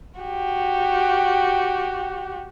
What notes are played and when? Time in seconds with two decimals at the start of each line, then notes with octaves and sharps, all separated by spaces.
0.20 F#4 G4